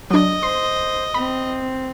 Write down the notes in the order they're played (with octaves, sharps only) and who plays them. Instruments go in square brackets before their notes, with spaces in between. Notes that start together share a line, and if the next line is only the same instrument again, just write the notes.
[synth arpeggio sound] F#3 D4 [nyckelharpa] D#5
[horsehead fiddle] C5 [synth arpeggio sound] C6
[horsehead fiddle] C4 [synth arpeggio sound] B5